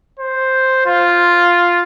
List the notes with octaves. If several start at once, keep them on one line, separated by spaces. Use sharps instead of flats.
C5
F4